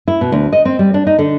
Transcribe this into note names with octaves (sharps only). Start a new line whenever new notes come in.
E4
B2
D2
D#5
C4
G3
D4
D#4
D3